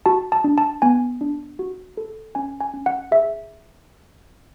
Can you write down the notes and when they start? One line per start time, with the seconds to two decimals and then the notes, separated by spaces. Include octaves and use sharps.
0.06 F#4 A5
0.32 A5
0.44 D4
0.58 A5
0.82 B3 G#5
1.21 D4
1.59 F#4
1.97 A4
2.35 C#4 G#5
2.61 G#5
2.74 C#4
2.86 F#5
3.11 G#4 E5